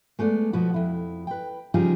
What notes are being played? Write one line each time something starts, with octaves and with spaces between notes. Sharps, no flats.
G#3 A3 B3 D5
B2 F3 B3 F#4
F2 E4
B4 G5
C#3 F3 G3 D#4 F4 G#4